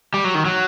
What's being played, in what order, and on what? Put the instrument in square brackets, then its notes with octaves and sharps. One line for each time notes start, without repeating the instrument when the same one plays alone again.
[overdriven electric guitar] G3
F#3
D#3
F#3